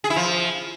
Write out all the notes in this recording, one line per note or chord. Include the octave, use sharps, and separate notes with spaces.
G#4
E4
F3